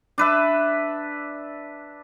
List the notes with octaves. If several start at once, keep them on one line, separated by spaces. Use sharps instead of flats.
D4 B4 E5